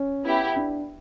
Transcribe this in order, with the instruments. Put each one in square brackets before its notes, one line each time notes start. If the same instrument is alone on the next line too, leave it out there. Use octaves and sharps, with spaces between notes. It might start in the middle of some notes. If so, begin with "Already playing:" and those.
Already playing: [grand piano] C#4
[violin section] B3 E4 G4
[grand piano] D4